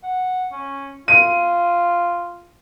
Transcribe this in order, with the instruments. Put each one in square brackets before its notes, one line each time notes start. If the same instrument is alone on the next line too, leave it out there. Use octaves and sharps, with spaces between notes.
[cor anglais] F#5
C#4
[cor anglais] F4 [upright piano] D#7